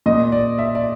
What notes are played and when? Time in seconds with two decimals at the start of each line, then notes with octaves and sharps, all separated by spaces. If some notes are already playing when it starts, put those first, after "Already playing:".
0.06 A#2 D#5
0.32 D5
0.58 E5
0.75 D5